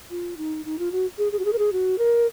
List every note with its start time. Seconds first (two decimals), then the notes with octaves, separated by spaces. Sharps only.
0.10 F4
0.37 D#4
0.65 D#4
0.79 F4
0.92 F#4
1.18 G#4
1.32 G#4
1.39 F#4
1.45 G#4
1.53 A#4
1.58 G#4
1.72 F#4
1.98 A#4